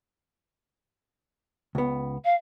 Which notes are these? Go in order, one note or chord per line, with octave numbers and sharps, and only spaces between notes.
C#2 B3
F5